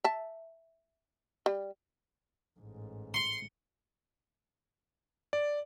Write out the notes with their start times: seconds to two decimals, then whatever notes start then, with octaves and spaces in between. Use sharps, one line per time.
0.04 E5 A5
1.46 G3
2.59 A1 G#2
3.14 C6 C#7 G7
5.33 D5